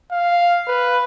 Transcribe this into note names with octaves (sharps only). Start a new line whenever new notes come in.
F5
B4